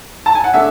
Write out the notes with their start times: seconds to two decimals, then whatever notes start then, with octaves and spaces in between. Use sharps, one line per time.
0.26 A5
0.35 G#5
0.44 F#5
0.54 A3 D4 E5